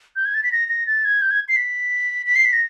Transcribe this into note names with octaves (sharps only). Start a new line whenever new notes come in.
G6
G#6
A6
B6
A#6
A#6
A6
G#6
G6
G#6
C7
B6
B6
C7
B6
A#6